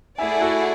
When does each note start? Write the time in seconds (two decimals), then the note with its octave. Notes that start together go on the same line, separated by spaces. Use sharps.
0.18 A3 E4 G#4 D5 E5 F#5 G#5
0.41 F#4 A4